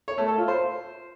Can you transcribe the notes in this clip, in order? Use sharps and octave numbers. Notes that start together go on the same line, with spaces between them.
C#5
A3
A4
F4
C5